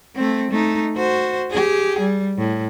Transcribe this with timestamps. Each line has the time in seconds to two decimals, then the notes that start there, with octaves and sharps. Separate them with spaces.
0.15 A3 C4
0.51 A3 D#4
0.96 F#4 C5
1.50 G4 G#4
1.99 G3
2.38 A2